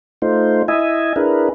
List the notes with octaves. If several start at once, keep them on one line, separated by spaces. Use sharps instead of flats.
A3 D#4 F4 C5
E4 D#5 E5 G#5
D4 E4 G#4 A#4 B4